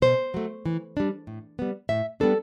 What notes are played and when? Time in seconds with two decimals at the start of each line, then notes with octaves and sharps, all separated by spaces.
0.02 B2 C5
0.34 F#3 A3
0.66 E3
0.97 G3 D4
1.27 A2
1.59 G3 B3
1.89 A2 E5
2.20 G3 B3 D4 A4